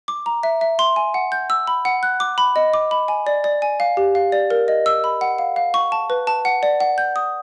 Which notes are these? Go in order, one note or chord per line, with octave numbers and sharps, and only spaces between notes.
D6
A#5
E5
E5
C6
G#5
F#5
G6
E6
B5
F#5
F#6
D6
B5
D#5
D6
B5
G#5
D5
D5
G#5
F5
G4
F5
D5
A#4
D#5
E6
B5
F#5
F5
F5
C#6
A5
B4
A5
F#5
D5
F#5
G6
D#6